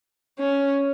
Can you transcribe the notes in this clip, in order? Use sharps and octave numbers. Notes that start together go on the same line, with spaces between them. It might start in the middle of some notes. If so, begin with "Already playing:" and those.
C#4